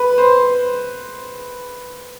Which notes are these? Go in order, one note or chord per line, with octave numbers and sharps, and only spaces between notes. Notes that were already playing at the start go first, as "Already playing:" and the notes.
Already playing: B4
C5